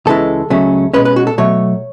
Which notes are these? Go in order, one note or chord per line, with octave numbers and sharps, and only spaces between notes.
C#2 C#3 E3 G#3 A4
C#2 C#3 F#3 A3 C#4
B2 G#3 C#4 B4
B4
F#4
A4
B2 F#3 A3 C#5